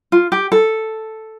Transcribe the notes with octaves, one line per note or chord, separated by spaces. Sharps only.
F4
G4
A4